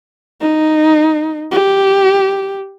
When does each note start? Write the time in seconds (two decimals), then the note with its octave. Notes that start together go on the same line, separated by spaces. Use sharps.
0.41 D#4
1.51 G4